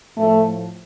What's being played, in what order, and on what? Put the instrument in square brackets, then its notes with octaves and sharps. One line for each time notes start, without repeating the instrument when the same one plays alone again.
[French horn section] A2 F3 A3